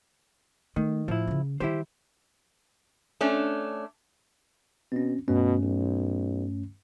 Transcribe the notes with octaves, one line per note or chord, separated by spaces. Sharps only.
D#3 A3
A2 F3 E4
C#3 C#4
D#3 G3 E4 G4 C5
A3 C#4 D4
B2 C4 C#4
G2 B2 A3 C#4
B1